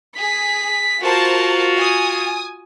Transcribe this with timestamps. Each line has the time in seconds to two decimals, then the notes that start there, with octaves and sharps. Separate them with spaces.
0.17 G#4 B6
1.03 F4 F#4 A#4 C5 A5
1.77 G#5 D#6